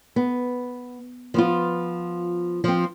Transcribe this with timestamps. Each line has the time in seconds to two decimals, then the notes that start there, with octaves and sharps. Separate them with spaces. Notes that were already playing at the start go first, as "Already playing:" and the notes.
0.16 B3
1.34 F3 B3 F4
2.64 F3 C4